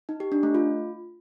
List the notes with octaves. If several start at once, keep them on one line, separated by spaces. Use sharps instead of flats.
D#4
G4
D4
A3
F4